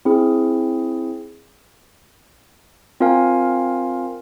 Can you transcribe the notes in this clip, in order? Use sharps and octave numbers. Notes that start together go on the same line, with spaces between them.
C4 E4 G#4
C4 F4 A#4 F5 G#5